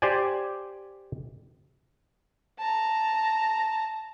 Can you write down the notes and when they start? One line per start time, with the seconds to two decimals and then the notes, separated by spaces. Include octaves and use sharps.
0.02 G4 C5 D5 G#5
2.59 A5 A#5